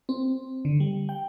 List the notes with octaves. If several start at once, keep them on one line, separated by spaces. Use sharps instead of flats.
C4
D3
G3
G5